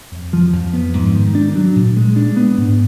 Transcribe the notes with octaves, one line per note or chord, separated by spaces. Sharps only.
F2
F3
F2
B3
G#2
D#3
D4
F#3
A#2
G#3
D4
B3
G#2